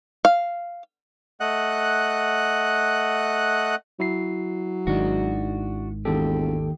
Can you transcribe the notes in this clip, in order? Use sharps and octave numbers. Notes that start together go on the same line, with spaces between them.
F5
A3 D#5 F#5 F#6
F#3 E4 C7
G#1 G#2 D#3 D4 F#4
E1 D#2 G4 A4